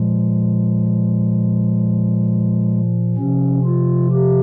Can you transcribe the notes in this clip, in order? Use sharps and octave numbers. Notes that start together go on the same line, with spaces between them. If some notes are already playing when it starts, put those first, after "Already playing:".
Already playing: A#2 F3 G#3
C3 F3 C#4
F4
G4